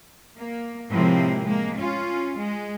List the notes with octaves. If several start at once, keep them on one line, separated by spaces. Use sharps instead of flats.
A#3
A2 C3 F3 G#3 A#3 C4
G#3 A#3
C#4 F4
G#3